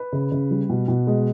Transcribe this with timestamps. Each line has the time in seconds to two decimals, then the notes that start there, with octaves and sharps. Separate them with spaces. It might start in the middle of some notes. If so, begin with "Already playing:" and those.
Already playing: B4
0.13 C#3
0.32 C#3
0.51 G3
0.70 B2
0.88 B2
1.07 G#3